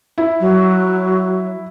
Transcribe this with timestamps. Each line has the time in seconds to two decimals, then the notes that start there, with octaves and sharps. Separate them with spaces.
0.18 E4
0.40 F#3